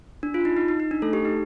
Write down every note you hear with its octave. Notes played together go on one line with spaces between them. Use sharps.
D4
F4
D#4
D#4
D#4
D#4
D4
A3 A4
G4
D#4